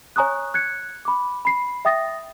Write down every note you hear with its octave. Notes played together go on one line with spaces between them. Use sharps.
C#5 G#5 A#5 C#6 D#6 F#6
F#6 G#6 C#7
B5 D6
B5 C7
E5 G5 D#6 A6 A#6